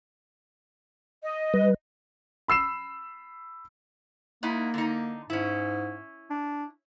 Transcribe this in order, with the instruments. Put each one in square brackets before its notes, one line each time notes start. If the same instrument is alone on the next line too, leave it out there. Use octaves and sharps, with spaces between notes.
[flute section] D#5
[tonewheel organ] G3 B4
[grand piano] B5 E6 C7 E7
[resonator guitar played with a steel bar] G#2 D#4 E4 [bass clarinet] A#3
[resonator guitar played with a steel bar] D3 D#4
[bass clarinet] G#2 [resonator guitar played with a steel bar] C#4 E4
[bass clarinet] D4